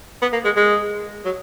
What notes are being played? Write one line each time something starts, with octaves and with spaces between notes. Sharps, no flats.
B3
A#3
G#3
G#3
F#3